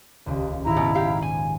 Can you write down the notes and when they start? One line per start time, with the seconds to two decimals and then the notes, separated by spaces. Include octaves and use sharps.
0.26 D#1 C#2
0.65 A#1 G#2 D#3 E4 A#5
0.77 B2
0.95 G4 F5
1.22 G#5